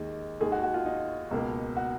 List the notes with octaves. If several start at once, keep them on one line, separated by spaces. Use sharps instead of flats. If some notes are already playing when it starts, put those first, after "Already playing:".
Already playing: D#2 D#3 G#3
D#2 D#3 G#3 G#4
F#4
F#4
F4
D#4
C#2 B2 A#3
F#4